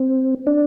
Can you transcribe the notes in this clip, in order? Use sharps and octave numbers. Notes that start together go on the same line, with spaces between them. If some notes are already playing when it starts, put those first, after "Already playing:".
Already playing: C4
D4